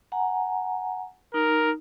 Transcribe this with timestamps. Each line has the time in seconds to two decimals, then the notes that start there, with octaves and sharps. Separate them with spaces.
0.12 F#5 G#5 A#5
1.34 D#4 A#4